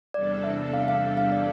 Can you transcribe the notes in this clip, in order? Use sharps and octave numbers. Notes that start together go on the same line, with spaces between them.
E2 C3 G3 D4 A4 D5
E5
F5
F5
F5
D5